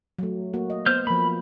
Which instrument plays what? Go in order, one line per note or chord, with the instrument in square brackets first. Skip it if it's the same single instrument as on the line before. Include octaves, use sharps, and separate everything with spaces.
[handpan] F#3 A3
A#3 F#4
D#5
[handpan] B3 [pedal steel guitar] C5 F6 G6
[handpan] F3 A#3 [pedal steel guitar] B5